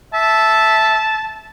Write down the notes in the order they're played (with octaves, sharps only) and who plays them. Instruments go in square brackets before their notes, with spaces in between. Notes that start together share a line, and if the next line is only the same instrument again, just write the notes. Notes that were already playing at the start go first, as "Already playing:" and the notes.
[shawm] E5 [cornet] A5